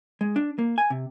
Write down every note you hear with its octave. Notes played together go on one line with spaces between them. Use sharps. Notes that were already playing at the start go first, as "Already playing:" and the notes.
G#3
D4
A#3
G#5
C3